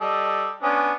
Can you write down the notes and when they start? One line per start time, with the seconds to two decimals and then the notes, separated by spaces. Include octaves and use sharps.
0.01 G3 A4 D#5
0.63 B3 C#4 D4